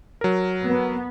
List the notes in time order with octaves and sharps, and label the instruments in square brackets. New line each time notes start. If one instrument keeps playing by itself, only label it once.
[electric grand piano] F#3 A#4
[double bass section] B3